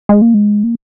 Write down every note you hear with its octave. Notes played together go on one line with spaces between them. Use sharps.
G#3
A#3
G#3
A#3